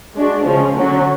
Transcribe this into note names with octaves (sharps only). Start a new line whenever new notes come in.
G#3 D4 F#4
C#3 F3 G#3 C#4
D3 F#3 C#4 F#4